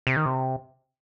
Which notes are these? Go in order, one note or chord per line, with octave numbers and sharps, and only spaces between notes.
C3
D#3
C3